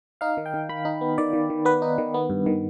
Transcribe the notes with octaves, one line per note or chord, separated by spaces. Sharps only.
D#4 F5
D#3
G5
D#3
D#3 B5
D#4
B3
D#3 D5
D#3
D#3
B3 B4
D#4
D#3
B3
G2
D#3